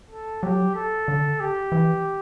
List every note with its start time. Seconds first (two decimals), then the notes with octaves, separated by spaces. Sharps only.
0.10 A4
0.43 F#3 G4
0.75 A4
1.08 D3
1.40 G4
1.72 E3